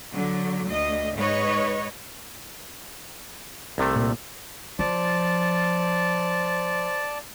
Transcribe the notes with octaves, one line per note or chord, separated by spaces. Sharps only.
D3 F#3
D2 D#5
G#2 B4 C#5 D#5
C2 C3 A3
A#2
F3 C5 D5 A5